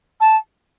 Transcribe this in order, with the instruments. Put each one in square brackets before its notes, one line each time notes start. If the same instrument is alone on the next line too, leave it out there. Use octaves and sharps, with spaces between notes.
[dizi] A5